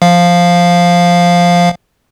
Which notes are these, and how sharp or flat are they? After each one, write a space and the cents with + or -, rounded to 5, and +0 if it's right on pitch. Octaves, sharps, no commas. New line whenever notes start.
F3 +0 F5 +0